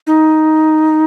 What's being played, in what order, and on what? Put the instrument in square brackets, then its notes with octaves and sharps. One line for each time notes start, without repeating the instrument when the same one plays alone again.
[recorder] D#4